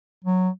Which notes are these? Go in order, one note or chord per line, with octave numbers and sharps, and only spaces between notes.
F#3